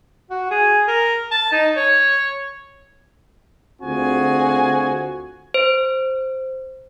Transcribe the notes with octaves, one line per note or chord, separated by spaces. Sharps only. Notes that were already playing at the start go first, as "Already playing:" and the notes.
F#4
G#4
A#4
A5
D#4
C#5
D2 C4 F4 F#4 G#4 G#5
C5